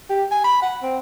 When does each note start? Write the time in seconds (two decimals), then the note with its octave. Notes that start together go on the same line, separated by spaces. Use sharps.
0.10 G4
0.31 G#5
0.44 B5
0.62 F#5
0.83 C4